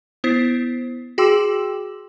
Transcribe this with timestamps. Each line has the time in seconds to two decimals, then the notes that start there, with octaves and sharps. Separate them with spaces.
0.24 B3 E4 C5 B6 C7
1.18 F#4 G#4 G5 C6 D6 E6